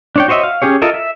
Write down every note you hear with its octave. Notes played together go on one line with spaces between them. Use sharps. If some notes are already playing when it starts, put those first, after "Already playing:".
D4 C#5 G5
F#4 C5 C#5 D#5 E5
F5
C#4 G4 G#4 C#5
F4 A4 A#4 D#5 E5
E5